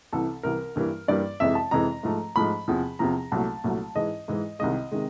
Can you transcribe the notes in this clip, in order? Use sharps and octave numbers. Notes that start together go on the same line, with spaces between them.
C2 C3 E3 A4
C2 C3 E3 A#4
G2 E3 G3 A#3
G2 E3 G3 A#3 D5
F2 C3 E3 G#3 E5
A5
F2 C3 E3 G#3 A#5
G#2 F3 A3
G#2 F3 A3 B5
E2 C3 F3
E2 C3 F3 A#5
C2 A#2 F#3 A3 A5
C2 A#2 F#3 A3
G#2 E3 G#3 D#5
G#2 E3 G#3
C2 C3 D#3 G#3 D#5
C3 D#3 G#3